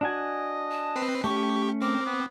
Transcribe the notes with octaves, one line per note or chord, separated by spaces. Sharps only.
D4 F#4 D#5 G#5
A5
C4 B4 C7
A3 C#4 G4 C#6
C4 A#4 D6
B3